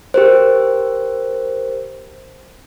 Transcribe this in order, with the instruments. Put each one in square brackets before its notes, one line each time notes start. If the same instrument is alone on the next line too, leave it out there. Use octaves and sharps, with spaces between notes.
[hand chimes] G4 A#4 C5